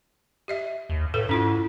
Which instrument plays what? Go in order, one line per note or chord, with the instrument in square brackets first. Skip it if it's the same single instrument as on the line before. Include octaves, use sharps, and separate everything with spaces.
[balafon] G4 D#5 E5
[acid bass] D#2
[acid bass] A2 [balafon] A4 B4
[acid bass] G#2 [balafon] C#4 E4 F4